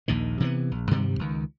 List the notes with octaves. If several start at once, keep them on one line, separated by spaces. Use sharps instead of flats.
A#1 D#2 A#2 D#3
C3 E3 G3 B3
A#1
G2 C3 D#3 G3
C#2 D#3